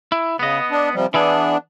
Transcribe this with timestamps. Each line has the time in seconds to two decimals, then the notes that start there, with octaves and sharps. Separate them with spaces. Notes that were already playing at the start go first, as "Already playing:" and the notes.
0.12 E4
0.39 C#3 B3 D#5
0.71 D4
0.94 C3 F3 G3
1.14 E3 B3 D4 E4 G#4